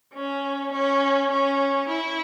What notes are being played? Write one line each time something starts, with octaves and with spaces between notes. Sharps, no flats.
C#4
C#4
C#4
E4